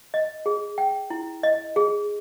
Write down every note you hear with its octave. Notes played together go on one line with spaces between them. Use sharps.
D#5
G#4
G5
E4
D#5
G#4